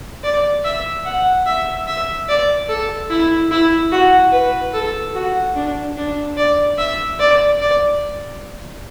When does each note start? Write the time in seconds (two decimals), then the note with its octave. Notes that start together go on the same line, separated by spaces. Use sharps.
0.23 D5
0.65 E5
1.05 F#5
1.46 E5
1.87 E5
2.28 D5
2.69 A4
3.10 E4
3.51 E4
3.92 F#4
4.32 B4
4.74 A4
5.15 F#4
5.55 D4
5.97 D4
6.37 D5
6.78 E5
7.19 D5
7.60 D5